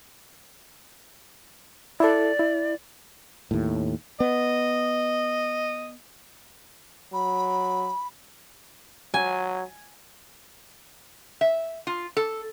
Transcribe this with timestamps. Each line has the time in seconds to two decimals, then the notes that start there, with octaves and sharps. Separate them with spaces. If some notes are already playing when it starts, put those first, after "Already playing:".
2.00 E4 A4 D5
2.39 E4
3.51 D#2 A2
4.20 B3 D#5
7.13 F#3 B5
9.14 F#3 G#5
11.41 E5
11.87 F4
12.17 A4